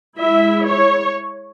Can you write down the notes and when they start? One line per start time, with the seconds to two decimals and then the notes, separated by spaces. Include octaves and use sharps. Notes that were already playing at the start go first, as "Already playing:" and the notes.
0.18 G#3 E4 E5
0.65 C#5